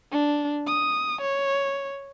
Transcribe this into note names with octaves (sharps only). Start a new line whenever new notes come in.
D4
D#6
C#5